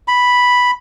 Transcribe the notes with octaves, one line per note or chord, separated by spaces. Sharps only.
B5